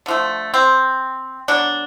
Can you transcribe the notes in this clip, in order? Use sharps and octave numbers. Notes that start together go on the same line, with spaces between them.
D3 F3 A3
C4
D3 F#3 B3 D4